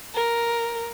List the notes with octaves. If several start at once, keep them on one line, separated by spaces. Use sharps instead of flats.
A#4